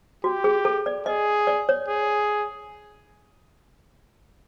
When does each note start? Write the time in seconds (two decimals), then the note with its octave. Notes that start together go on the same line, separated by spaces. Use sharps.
0.24 F#4 G4
0.44 G#4
0.65 A4
0.86 D5
1.06 G#4 D#5
1.47 D5
1.69 C#5
1.89 G#4